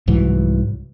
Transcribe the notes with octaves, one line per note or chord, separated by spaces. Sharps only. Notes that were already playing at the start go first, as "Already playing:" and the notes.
C2 G#2 E3 F#3